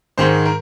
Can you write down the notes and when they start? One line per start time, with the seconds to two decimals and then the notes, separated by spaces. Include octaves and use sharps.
0.17 G#2 D#3 G#3 C5
0.45 A#4